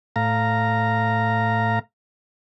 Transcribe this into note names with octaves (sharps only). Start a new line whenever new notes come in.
A2 F5 A#5